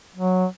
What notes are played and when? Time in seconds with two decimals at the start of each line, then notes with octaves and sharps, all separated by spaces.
0.16 F#3